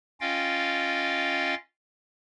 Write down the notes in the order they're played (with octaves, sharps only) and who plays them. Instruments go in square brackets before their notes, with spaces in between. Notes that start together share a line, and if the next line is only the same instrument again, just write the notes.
[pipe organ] C#4 F4 D#5 F5 G5 A6